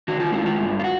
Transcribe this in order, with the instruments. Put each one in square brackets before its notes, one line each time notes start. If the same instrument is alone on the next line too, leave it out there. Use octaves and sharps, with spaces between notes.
[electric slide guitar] D#3 F#4
F4
G#3 E4
F4
G2
F4
F#4